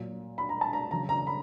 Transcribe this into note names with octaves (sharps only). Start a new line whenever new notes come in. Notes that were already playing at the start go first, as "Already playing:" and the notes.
Already playing: A#2 F#3
B5
A#5
A5
A#5
C#3 F#3 A#5
A#5
B5